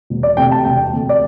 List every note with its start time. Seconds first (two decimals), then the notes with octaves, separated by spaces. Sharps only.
0.10 E1
0.23 D5
0.37 D2 C3 A3 G5
0.51 A5
0.65 E1 G5
0.92 D2 C3 A3
1.09 D5